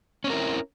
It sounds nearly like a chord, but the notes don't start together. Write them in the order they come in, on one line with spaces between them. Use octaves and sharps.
C#4 C4 A#4 E4